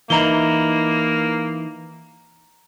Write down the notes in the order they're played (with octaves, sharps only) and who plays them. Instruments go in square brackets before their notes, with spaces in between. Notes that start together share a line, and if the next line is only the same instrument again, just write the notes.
[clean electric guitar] E3 D#4 E4 [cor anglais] A#3 [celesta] A#5 G7